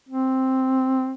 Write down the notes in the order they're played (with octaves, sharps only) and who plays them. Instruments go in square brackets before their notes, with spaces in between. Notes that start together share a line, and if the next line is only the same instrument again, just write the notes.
[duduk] C4